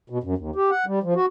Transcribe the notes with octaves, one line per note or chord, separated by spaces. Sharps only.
B2
F#2
D#2
G4
F#5
G3
F3
F#4